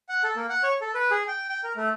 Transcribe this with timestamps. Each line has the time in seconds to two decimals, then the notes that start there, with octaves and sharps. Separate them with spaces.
0.09 F#5
0.24 A4
0.36 A#3
0.49 F#5
0.63 C#5
0.81 A4
0.95 B4
1.11 G#4
1.28 G5
1.49 G5
1.64 A#4
1.76 A3